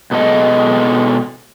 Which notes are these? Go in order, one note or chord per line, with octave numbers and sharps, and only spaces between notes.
B2 G#3 A4 D#5